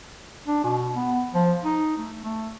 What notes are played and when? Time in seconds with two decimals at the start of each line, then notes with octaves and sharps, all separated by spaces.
0.46 D4
0.63 B2
0.94 B3
1.34 F3
1.64 D#4
1.97 A3
2.23 A3